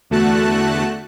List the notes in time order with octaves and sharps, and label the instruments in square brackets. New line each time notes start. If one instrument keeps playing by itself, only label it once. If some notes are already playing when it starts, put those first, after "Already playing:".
[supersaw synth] E2 D3 A3 F#4 A5 F#6